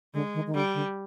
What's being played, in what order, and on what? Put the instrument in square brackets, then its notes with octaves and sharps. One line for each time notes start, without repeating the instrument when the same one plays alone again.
[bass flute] D3 [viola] G#3
[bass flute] D#3
D#3
[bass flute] D3 [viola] G3
[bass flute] D3